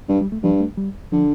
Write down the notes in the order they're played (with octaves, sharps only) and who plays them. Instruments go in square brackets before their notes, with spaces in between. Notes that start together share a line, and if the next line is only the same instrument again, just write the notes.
[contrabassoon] G2 [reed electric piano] G3
[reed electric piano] G3
A3
[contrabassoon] G2 [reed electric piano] F3
[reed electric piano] A3
G3
[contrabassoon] D3 [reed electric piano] F3